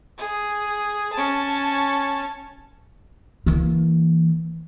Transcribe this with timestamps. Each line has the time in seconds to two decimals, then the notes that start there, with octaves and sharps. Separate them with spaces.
0.18 G#4
1.13 C#4 A5
3.46 E3 A#3